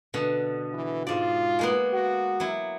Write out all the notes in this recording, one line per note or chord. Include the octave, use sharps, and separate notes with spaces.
B2 D3
E3
G#2 F4 D5
G#3 A#3 B3
F#4
F#3 E4